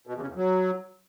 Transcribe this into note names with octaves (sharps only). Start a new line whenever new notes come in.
B2
E2
C#3
E2
F#3